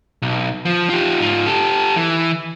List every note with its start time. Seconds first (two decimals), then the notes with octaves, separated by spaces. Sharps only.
0.22 B1
0.65 F3
0.90 F4 G4
1.20 G#2 F4
1.46 G4 A4
1.97 E3